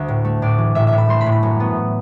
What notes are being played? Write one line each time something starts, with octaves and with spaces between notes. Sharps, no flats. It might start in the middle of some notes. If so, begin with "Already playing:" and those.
Already playing: D2 E5
A2
A3
A2 D5
E3
A2 E5
E5
A2
B5
A3 C6
B5
A2
B5
F#2
B3